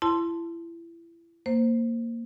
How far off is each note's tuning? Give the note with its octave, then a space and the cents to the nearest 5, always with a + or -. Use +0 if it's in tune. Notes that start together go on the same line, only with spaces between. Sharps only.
E4 +30 A5 +0 C6 +0
A#3 -10 C5 +0